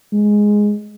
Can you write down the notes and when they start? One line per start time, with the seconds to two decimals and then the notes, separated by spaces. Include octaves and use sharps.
0.13 G#3